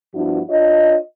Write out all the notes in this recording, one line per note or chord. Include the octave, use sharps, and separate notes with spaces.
G2 F3 B3 D4 E4 F#4
D4 F4 C#5 D#5